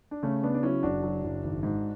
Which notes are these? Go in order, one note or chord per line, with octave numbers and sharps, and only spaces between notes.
D4
C#3 A3 C#4
C#3 B3 D4
D4
F#3 C#4 E4
F#1 D4 F#4
F#3
F#1
G#1
G#2